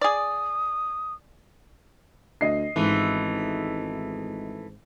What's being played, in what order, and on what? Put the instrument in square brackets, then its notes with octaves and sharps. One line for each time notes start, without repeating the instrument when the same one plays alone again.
[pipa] G#4 D5 [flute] D#6
[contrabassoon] D2 [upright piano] D#5 C7
[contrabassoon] G#1 [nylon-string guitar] G#2 C#4 F4 [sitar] E3 A3